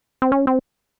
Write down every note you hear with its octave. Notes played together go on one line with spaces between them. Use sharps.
C4
C#4
C4